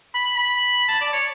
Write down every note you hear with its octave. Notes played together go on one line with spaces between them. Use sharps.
B5
B5
A5
D5
C#5